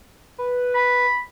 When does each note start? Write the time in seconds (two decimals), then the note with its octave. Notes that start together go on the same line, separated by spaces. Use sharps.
0.38 B4
0.75 B5